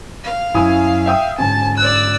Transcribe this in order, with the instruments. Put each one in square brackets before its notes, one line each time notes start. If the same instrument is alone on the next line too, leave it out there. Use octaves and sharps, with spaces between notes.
[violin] F5
[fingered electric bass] F#2 F#3 C#4 [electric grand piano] E4 G#5 D#6
[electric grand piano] E5 G5 D#6
[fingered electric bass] G#2 D3 C#4 [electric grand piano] G#5 [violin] A5
[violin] D5 E6 [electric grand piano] F#6